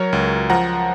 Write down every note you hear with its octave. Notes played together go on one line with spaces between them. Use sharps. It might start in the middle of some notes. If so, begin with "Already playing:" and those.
Already playing: F#3 A#4 C#5
C#2
F3 F#5 A#5